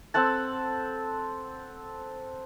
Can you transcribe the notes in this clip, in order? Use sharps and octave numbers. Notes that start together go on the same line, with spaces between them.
C4 A4 F#5 A5